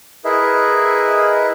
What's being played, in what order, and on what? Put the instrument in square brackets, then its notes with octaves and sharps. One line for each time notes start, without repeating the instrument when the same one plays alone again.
[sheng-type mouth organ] E4 G#4 A#4 B4 D#5 E5